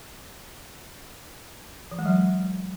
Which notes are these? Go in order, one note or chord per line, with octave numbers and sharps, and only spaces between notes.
E3
G#3
F#3